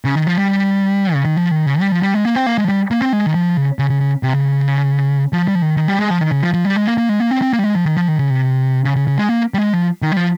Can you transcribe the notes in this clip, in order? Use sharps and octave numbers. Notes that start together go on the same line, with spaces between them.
C#3
D#3
F3
G3
C#3
D#3
F3
D#3
C#3
G3
F3
G3
G#3
A#3
C4
A#3
G#3
F3
G3
A#3
C4
G#3
D#3
F3
C#3
C#3
C#3
C#3
C3
C#3
F3
G3
F3
D#3
D#3
G3
G#3
F3
D#3
C#3
F3
F3
G3
G#3
A#3
A#3
G#3
A#3
C4
C4
A#3
G3
G#3
F3
D#3
F3
D#3
C#3
C3
C#3
C#3
C#3
G#3
A#3
G3
G#3
F3
D#3
G3
F3